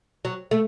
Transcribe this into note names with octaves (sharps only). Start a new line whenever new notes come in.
F#3
A3